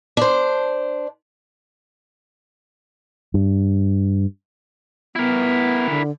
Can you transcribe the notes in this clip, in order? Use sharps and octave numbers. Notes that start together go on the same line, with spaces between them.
D4 C5
G2
B3 E4 A#4
D3